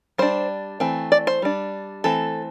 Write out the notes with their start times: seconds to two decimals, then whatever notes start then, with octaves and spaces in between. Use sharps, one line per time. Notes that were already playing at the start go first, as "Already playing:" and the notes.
0.18 G3 D4 C5
0.80 E3 A3 C4
1.12 D5
1.27 C5
1.42 G3 D4
2.04 E3 A3 C4 A4